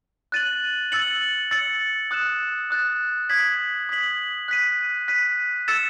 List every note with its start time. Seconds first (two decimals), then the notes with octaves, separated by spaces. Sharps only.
0.32 F#6 A6 D#7 F#7
0.92 E6 A6 C#7 F#7
1.51 E6 A6 C#7 F#7
2.11 D#6 F#6 A6 E7
2.71 D#6 F#6 A6 E7
3.29 D#6 G#6 B6 F#7
3.89 D#6 G#6 B6 F#7
4.48 F#6 B6 D#7
5.08 F#6 B6 D#7
5.68 E6 A6 C#7 E7